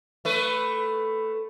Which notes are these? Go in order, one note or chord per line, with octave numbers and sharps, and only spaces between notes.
A3 B4